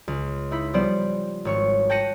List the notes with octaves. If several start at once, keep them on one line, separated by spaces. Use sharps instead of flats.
C#2
D#4 E4 B5
F3 G3 B3 C5 D5
G#1 C#5 C#6
G5 A5 F#6 A#6 C#7 D#7